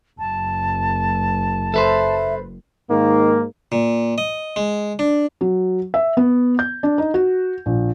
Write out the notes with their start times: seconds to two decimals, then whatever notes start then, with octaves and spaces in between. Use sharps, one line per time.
0.19 F#1 A5
1.74 A4 B4 C5 E5
2.90 G#2 D#3 A#3
3.72 A#2
4.18 D#5
4.56 G#3
4.99 D4
5.41 F#3
5.94 E5
6.17 B3
6.59 G6
6.83 D4
6.98 D#4
7.14 F#4
7.66 A#1